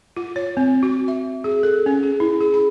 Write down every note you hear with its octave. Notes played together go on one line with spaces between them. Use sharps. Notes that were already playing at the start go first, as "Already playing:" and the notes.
F4
C#5
C4
F#4
E5
G#4
A4
C#4
G#4
E4
G#4
B5